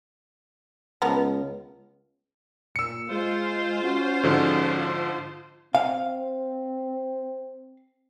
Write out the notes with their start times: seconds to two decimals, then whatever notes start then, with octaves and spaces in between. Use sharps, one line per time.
1.02 C#2 F3 B3 A#4
2.76 A#2 E6 C#7
3.10 G#3 F4 C5
3.82 C#4 F#4
4.23 G#2 D3 F3
5.75 C4 F5